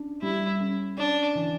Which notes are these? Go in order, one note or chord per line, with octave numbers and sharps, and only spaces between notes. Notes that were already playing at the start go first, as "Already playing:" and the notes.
Already playing: C#4 D4
G3 E4
C#4
C#4 D4
E3